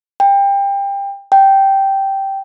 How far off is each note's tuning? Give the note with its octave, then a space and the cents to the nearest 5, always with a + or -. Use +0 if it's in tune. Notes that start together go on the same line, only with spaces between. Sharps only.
G5 +25
G5 -10